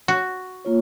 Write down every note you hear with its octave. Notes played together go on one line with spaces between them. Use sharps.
F#4
A#3 F4 C#5